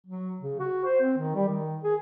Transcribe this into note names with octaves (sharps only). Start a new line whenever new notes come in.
F#3
C#3
F#4
C5
C4
D#3
G3
D#3
G#4